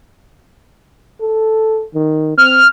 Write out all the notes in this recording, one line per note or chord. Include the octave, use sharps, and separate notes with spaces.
A4
D#3
C4 F6